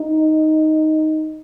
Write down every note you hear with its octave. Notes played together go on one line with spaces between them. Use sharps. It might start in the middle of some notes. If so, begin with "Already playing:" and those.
Already playing: D#4